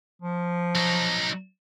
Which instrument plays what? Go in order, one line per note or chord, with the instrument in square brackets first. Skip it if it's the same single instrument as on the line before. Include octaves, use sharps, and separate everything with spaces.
[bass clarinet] F3
[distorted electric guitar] F#3 D#4